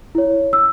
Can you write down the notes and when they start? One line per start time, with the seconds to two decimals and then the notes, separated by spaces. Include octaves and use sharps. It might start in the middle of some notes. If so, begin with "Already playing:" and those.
0.15 E4 C#5
0.53 E6